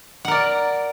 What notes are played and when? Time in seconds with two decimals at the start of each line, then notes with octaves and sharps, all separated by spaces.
0.25 F#5
0.28 A#4
0.31 D5